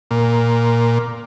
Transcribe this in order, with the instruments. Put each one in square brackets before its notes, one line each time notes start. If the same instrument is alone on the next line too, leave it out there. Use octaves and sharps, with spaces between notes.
[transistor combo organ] A#2